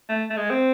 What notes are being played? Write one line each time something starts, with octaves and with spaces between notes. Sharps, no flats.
A3
A3
G#3
C4